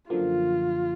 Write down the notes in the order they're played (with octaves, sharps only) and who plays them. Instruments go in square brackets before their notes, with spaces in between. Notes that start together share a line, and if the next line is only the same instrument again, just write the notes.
[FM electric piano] F#2 D3 F3 A#3 [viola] F4